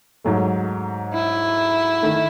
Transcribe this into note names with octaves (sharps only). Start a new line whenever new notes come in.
G#2 F#3 A3
E4
D#3 A3